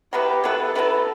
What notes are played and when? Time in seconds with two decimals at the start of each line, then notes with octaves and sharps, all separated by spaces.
0.13 F#3 B3 E4 G4 B4
0.44 F#3 B3 E4 A4 B4
0.75 F#3 B3 E4 B4